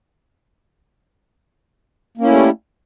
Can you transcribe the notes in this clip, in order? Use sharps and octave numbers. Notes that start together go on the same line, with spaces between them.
G3 A3 A#3 C#4 E4